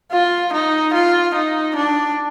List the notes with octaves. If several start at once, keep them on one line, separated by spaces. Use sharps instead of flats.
F4
D#4
F4
D#4
D4